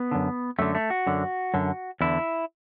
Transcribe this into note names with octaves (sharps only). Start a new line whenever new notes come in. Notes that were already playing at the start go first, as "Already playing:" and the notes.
Already playing: B3
F#2 D3
F#2 D3 A3
A3
F#4
F#2 D3
F#2 D3
E2 D3 E4